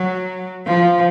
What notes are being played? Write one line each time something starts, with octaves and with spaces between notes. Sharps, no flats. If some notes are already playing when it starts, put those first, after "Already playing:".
Already playing: F#3
F3